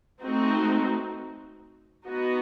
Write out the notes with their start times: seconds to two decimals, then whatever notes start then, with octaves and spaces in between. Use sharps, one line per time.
0.22 A3 C4 D#4 F#4
2.06 B3 D#4 F#4